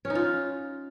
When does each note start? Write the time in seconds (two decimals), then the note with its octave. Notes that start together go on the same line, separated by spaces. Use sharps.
0.05 C#4
0.10 D#4
0.15 F4